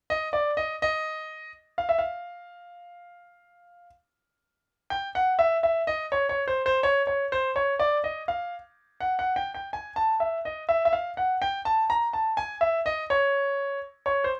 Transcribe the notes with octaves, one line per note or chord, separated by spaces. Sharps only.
D#5
D5
D#5
D#5
F5
E5
F5
G5
F#5
E5
E5
D#5
C#5
C#5
C5
C5
C#5
C#5
C5
C#5
D5
D#5
F5
F#5
F#5
G5
G5
G#5
A5
E5
D#5
E5
E5
F5
F#5
G5
A5
A#5
A5
G#5
E5
D#5
C#5
C#5
C5